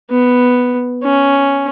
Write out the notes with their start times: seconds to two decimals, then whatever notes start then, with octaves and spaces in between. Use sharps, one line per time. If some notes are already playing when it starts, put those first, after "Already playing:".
0.11 B3
1.04 C#4